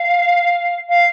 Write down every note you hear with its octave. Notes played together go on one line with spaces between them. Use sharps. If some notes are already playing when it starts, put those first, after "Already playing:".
Already playing: F5
F5